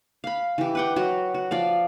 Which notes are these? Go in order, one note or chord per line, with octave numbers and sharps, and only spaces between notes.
F5 B5
E3 G4
B4 F#5 G5
F#3 F#4
F#4
F3 D5 F5